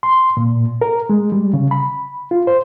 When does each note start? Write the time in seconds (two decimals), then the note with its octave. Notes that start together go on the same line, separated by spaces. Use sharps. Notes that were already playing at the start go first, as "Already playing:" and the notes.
0.03 C6
0.37 A#2
0.81 A#4
1.10 G#3
1.32 G3
1.54 C#3
1.71 B5
2.31 F4
2.47 C5